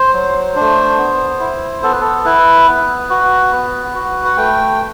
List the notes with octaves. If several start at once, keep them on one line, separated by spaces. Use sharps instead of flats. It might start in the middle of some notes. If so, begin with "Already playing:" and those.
Already playing: C5
F#3
A3 D4
B3
E4
B3 A4
B4
A4
E4 B4
B3
F#4
B3
F#4
F#5
A3 G5